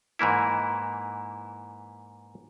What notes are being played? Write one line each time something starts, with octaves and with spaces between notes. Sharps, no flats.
G#2 E3 A#3 E4